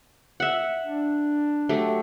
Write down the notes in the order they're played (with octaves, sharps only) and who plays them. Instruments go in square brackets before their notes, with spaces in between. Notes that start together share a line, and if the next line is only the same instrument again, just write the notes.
[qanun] E5 F#5
[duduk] D4
[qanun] F#3 A3 G4